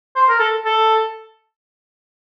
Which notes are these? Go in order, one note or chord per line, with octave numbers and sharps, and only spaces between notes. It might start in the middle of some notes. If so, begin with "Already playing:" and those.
C5
A#4
A4
A4